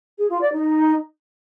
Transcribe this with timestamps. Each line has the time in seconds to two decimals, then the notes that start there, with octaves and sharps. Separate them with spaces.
0.18 G#4
0.29 F4
0.41 D5
0.52 D#4